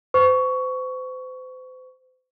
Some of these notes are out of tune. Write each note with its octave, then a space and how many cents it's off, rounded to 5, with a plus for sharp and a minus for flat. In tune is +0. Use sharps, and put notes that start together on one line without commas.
C5 -40 C#6 +15